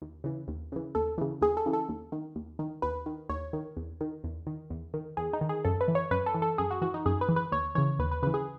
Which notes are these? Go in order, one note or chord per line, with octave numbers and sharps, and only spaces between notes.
D#2
C#3 E3
D#2
C#3 E3
D#2 A4
C#3 E3
D#2 G#4
A4
C#3 E3
A4
D#2
D#3
D#2
D#3
D#2 B4
D#3
D#2 C#5
D#3
E2
D#3
E2
D#3
E2
D#3
E2 G#4
D#4
D#3
G#4
F#2 A4
B4
E3
C#5
F#2 B4
A4
E3
A4
F#2 G#4
F#4
E3 F#4
D#4
F#2 G#4
B4
E3
B4
D#2 C#5
C#3 E3 C#5
D#2 B4
B4
C#3 E3 B4
G#4